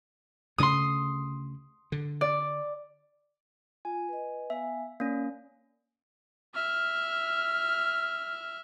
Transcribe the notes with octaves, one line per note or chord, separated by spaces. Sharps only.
D2 C#3 A3 C6 D#6
D3
D5
F4 G#5
B4 D#5
B3 E5 F5 G#5
A#3 C#4 D5
E5 F6